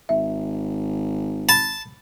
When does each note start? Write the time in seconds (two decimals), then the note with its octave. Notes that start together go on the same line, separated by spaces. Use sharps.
0.09 G#1 E5
1.49 A5 B5